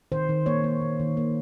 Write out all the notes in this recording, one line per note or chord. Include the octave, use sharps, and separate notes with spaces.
D#3 C5
D#3
A#3 C#5
A#3
D#3
D#3
A#3